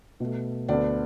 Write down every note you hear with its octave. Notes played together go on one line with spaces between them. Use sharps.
B2 A3
D2 D3 B3 D5